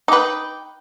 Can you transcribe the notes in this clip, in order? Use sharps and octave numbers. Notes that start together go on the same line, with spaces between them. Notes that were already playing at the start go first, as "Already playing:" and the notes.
D#4 B4 G5 D6